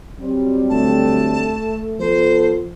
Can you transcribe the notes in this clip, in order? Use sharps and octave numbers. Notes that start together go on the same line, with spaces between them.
F#3 G3 C4
D2 A3 A5
F3 B3 A4 C5